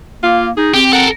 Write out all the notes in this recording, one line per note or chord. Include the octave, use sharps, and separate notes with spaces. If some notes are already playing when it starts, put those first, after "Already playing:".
A#3 F4
D#4 G#4
C4 G4
A4 A#4 F#5